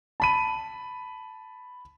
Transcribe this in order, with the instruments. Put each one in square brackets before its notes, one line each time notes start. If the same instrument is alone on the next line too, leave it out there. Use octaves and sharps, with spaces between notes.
[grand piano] A5 B5 D#7